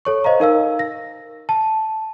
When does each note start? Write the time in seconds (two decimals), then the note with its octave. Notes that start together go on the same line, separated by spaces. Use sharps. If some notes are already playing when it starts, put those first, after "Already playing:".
0.05 A4 C#5 C#6
0.24 C5 D#5 F5 A#5
0.40 D#4 A#4 F5 E6
0.79 A#6
1.49 A5